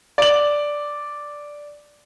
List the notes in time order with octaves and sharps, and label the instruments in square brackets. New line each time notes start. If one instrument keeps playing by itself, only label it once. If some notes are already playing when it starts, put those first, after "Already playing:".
[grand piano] D5 F#7